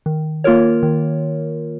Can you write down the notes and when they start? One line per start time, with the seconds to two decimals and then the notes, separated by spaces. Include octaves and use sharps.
0.06 D#3
0.44 A#3 F4 A#4 C#5
0.83 D#3